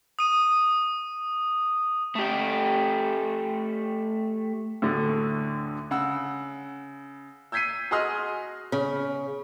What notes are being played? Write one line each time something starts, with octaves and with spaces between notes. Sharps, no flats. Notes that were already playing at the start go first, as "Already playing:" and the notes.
D#6 D#7
A3 G4
D2 A2 D3
C#3 F#5 E6
E6 G6 G#6 B6 C7 D#7
F#4 G#4 D#5 C6 D#6 F6
C#3